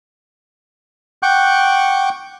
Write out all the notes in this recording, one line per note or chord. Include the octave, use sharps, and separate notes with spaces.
F#5 G5 C#6 D6 F#6 G6